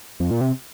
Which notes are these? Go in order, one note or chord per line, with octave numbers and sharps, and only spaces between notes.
F2
A#2
C3